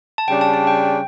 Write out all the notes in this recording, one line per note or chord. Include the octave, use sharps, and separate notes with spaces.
A5
C#3 G3 D4 G5
A5
A5
G5